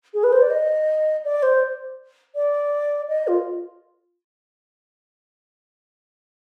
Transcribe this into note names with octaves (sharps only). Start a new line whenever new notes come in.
G#4
B4
C5
D5
D#5
D5
C5
D5
D#5
F4